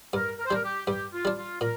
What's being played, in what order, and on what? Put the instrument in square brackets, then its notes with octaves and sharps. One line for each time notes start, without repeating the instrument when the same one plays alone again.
[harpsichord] G2 [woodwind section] A#4
[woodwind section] A#4
C5
[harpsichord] G3 D4 [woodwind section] A#4
[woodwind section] G4
[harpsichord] G2 [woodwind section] G4
[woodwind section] F4
[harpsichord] G3 D4
[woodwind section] F4
[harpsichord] A#2 [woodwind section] A#4